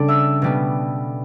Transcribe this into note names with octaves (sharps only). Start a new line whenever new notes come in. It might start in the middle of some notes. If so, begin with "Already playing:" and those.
Already playing: C#3 G3 D4 A4 D5 A5 D6
E5 E6
B2 G3 B3